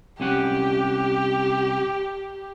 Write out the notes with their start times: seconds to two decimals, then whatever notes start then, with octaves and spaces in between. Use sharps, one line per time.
0.20 C2 C#4 G4 F#5